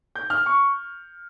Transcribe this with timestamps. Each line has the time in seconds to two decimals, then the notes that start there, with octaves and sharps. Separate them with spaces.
0.16 G6
0.30 F6
0.46 C#6